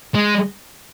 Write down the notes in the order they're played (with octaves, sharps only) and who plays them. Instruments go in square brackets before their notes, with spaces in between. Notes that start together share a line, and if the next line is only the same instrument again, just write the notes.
[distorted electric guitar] G#3